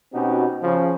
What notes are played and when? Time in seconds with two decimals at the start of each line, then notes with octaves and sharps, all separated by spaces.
0.13 B2 C4 C#4 D#4 F#4 G4
0.62 C#3 F3